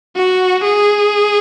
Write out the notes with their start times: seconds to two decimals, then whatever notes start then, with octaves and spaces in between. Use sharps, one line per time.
0.16 F#4
0.64 G#4